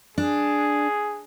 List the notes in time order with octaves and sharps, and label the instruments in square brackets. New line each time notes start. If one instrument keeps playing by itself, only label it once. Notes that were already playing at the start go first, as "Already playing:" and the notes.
[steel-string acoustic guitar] D4 [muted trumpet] G#4